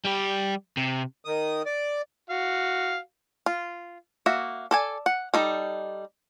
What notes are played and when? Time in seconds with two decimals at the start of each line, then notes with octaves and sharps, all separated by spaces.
0.05 G3 G4
0.77 C3
1.25 D#3 D#6
1.66 D5
2.30 F#4 F5
3.46 F4
4.26 A#3 F#4 E5
4.71 A4 D5 G#5
5.06 F#5
5.34 G3 D#4 A4